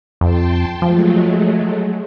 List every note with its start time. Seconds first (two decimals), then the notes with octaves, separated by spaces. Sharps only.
0.21 F2 G5 A5 C6
0.82 F3 F#3 G#3 A3